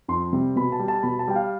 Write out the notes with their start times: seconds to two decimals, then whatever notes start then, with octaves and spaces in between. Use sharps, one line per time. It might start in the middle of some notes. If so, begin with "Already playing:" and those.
0.08 F2 C6
0.33 C3 G3
0.56 B2 B5
0.72 A5
0.79 G3
0.88 A5
1.03 B2 B5
1.19 A5
1.28 G3 G5
1.36 F5